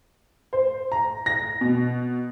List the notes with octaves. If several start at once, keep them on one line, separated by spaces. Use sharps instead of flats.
C5
A#5
A#6
B2